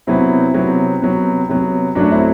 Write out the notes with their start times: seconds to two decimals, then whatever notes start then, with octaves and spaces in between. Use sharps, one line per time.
0.07 C3 F#3 B3 C4 E4
0.54 C3 F#3 B3
1.02 C3 F#3 B3
1.49 C3 F#3 B3
1.95 F#2 F#3 A3 D4 F#4
2.11 C4 E4